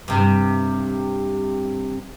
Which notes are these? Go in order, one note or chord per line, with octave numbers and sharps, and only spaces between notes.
G2 C3